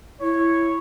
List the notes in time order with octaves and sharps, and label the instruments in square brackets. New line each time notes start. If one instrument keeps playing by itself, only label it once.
[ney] E4 [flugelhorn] C#5